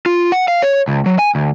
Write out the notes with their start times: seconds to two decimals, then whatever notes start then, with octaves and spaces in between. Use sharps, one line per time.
0.06 F4
0.32 F#5
0.48 F5
0.62 C#5
0.88 C#2
1.06 F#3
1.19 G#5
1.35 D2